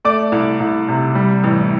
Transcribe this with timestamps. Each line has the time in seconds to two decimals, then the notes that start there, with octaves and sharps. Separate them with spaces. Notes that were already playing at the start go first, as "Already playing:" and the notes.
0.05 A3 D5 D6
0.32 C2
0.60 C2
0.88 C3
1.15 G3
1.44 A1